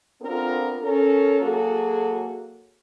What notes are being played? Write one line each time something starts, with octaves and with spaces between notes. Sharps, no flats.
B3 C4 D4 F4 A4 A#4
C#4 A4 A#4
F#3 A#3 F#4 G#4 A4